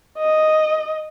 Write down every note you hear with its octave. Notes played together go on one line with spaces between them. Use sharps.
D#5